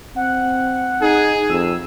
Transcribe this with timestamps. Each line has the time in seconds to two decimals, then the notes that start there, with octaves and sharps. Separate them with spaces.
0.16 C4 F#5
1.01 D#4 G#4
1.49 F2 E6